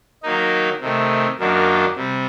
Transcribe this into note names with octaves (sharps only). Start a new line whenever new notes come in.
D#3 F#3 A#3 D#4
C3 D#3 A3
F#2 D#3 F#3 A#3 D4
C3 G3